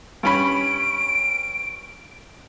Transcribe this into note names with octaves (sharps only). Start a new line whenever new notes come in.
G2 C#4 B5 D7